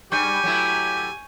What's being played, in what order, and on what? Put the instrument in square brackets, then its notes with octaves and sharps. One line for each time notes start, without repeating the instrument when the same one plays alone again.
[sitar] G2 G3 [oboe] G4 [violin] G#5 [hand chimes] C#6 G6 C#7
[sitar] F#3 A3 E4